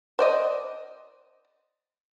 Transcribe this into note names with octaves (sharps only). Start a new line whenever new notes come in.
C5 D5 D#5